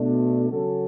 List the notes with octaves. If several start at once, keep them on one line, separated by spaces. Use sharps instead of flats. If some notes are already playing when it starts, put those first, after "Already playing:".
Already playing: B2 A3 D4
C#3 F#3 C#4 F#4 A4